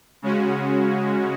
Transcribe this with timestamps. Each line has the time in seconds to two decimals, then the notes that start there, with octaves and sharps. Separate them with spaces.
0.22 C#3 G#3 C#4 F#4